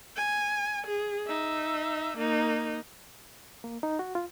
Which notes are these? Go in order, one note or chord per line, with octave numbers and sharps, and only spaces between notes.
G#5
G#4
D#4 E5
A#3 D#4
A#3
D#4
F#4
F4